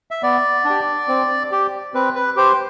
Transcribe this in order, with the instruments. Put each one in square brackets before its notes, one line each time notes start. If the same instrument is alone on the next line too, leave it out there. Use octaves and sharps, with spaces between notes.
[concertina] E5
B3 D5
D4
G4
C4
G4
C4 B4
B4
G4 C5